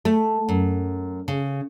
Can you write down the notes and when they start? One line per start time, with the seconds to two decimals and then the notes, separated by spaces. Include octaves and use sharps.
0.05 A3
0.49 F#2
1.28 C#3